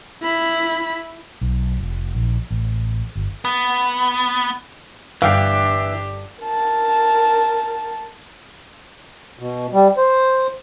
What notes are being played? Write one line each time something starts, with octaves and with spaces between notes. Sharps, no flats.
E4 B5
B1
F1
A#1
A1
G1
B3
G1 E3 D4 G4 F5 G5
A#4 A5
B2
G3
C5